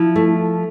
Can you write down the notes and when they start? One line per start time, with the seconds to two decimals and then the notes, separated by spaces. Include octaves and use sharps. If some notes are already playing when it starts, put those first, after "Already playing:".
Already playing: F3 E4
0.16 A3